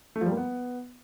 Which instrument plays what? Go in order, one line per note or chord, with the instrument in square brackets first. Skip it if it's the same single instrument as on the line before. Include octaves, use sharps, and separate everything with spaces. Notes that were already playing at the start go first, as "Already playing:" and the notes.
[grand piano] A3
F3
G3
A#3
B3